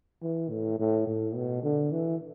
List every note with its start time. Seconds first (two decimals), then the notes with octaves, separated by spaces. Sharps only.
0.23 E3
0.50 A2
0.79 A2
1.07 A2
1.35 B2
1.63 D3
1.92 E3